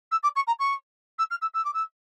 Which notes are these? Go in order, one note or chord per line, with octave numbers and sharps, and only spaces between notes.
E6
D6
C#6
A#5
C#6
E6
F6
E6
E6
D6
E6